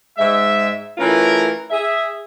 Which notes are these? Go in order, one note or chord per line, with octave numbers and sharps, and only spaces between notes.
G#2 G#3 E5
E3 A3 C#4 F4 A#4
G#4 E5